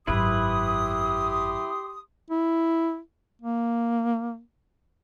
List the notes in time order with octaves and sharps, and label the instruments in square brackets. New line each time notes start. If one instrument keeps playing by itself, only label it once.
[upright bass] G#1 F#2 [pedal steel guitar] E4 B4 [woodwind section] G4 C6 D#6
[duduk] E4
A#3